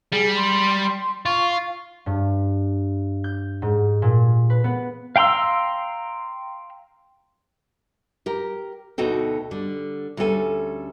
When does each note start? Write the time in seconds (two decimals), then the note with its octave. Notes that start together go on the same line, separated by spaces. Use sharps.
0.12 G3 G#4
0.36 C6
1.26 F4 C#6
2.06 G2
3.24 G6
3.62 G#2
4.02 A#2
4.50 B4
4.64 B3
5.16 F5 G5 A#5 C6 E6
8.26 G4 A#4
8.98 D2 B2 D#4 F#4 A4 G5
9.51 D3 G3
10.17 D2 G3 C#4 A4 G#5